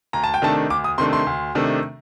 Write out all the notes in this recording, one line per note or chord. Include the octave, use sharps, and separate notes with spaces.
D2 A#5
A5
G5
C3 D#3 A3 D4 A5
D2 D6
D#6
C3 D#3 A3 D4 C6
C6
D2
C3 D#3 A3 D4